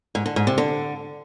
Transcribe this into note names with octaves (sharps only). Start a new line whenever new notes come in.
G#2
D3
G#2
C3
D3